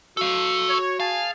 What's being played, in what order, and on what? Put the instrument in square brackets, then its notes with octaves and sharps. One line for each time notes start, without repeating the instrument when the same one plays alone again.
[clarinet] F#4 [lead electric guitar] A4 F5
[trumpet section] C#5
[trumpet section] G#4 G#5 A5 [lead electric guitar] F5